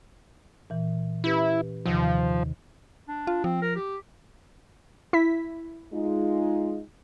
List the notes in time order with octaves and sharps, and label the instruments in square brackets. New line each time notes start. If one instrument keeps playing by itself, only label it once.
[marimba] A#2 E3
[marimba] C#4 G4 B4 [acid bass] E4
[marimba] D#2 C3 D#3 [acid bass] F3
[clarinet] D4
[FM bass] F4
[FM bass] F3 [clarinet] C4
[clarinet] A#4
G4
[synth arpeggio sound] E4 B6
[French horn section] G#3 D#4 F4